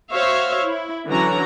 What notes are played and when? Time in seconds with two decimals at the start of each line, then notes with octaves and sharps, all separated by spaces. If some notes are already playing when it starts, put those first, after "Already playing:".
0.12 F#4 C5 C#5 E5 F5
0.64 E4
1.08 D3 E3 F#3 C#4 F#4 A#5